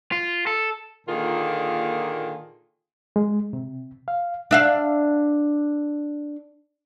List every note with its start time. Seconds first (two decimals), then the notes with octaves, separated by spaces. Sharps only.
0.12 F4
0.47 A4
1.07 A#2 D3 D#3 A#3 F4 G#4
3.16 G#3
3.53 C3
4.08 F5
4.51 D4 E5 F5